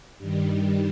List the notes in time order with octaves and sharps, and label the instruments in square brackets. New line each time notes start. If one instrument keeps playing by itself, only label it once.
[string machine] G2 D#3 G3